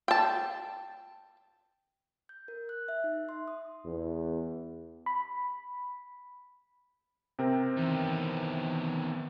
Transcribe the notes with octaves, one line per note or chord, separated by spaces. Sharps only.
G5 A5
G6
A#4
F#6
E5
D#4
C6
D#6
E2
B5
C3 C4 A#4
D#3 E3 B3